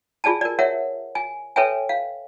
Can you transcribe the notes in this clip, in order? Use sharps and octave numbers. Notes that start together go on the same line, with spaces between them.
F4 G#4 D5 G#5 A5
A#4 D5
A#4 C#5 E5 F#5
G#5
A4 B4 C#5 E5 G5 G#5
F5